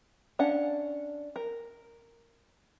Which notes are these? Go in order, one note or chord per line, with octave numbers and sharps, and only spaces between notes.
C#4 D4 F5 F#5
A#4